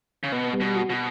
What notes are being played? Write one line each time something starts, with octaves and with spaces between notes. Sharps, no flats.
C#3
B2 B3
G3
B2
F#4
B2